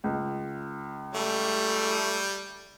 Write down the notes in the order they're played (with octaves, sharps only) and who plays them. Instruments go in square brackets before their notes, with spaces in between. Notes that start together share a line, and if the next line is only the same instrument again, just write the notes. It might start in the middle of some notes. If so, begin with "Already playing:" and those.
[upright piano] C#2
[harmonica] G3 [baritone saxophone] A3